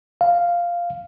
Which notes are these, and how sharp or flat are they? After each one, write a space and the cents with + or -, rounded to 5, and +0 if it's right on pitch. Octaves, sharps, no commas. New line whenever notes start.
F5 -5